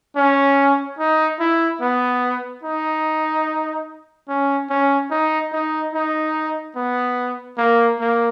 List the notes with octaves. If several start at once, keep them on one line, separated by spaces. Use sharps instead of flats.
C#4
D#4
E4
B3
D#4
C#4
C#4
D#4
D#4
D#4
B3
A#3
A#3